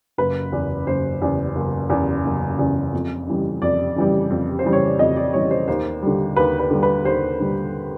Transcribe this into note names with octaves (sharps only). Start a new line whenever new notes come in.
F#1 B4
E2 C#3
F#1 C5
E2 C#3
F#1
E2 C#3
F#1
E2 C#3
F2
C#3 E3 G3
F2 D5
C#3 E3 G3
F2
C5
C#3 E3 G3
C#5
D5
F2 D#5
D5
C#3 E3 G3 C#5
C5
D#2 C5
D3 G3
D#2 B4
B4
D3 G3
B4
D#2 C5
D3 G3